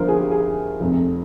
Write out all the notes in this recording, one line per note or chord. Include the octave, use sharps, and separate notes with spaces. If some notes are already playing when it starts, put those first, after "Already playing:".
Already playing: G1 G2 D3 F3 A#4 C5
G#4
G4
G#4
F1 F2 C3